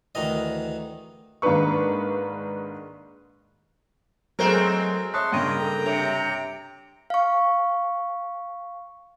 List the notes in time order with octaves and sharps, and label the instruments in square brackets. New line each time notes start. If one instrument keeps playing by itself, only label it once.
[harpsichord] D2 D#3 E3 D#5
[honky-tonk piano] G#2 D#3 A#3 D4 B4 C#6
[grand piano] F#3 A3 G7 [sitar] G#3 C4 A#4 [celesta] C5
[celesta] C#5 D#6 F#6 [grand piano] E5 A5 [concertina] C6 C#6
[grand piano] G2 C#3 A#3 [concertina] G5 A#5 [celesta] C6 D#7
[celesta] A4 A#4
[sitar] C3 [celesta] D4 C#5 F7
[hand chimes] F5 C#6